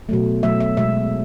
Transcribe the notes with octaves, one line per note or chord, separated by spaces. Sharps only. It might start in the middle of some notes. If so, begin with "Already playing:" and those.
B2 F#3 A3
B2 F#3 A3 E5
E5
B2 G#3 E5